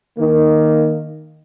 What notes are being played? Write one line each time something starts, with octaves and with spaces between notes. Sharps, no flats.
D#3 A#3